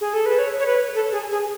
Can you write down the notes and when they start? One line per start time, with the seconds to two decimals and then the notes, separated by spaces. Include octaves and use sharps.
0.01 G#4
0.13 A4
0.26 B4
0.39 C#5
0.59 C#5
0.66 B4
0.95 A4
1.12 G#4
1.31 G#4